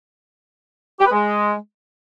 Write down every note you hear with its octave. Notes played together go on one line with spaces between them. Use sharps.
G4
B4
G#3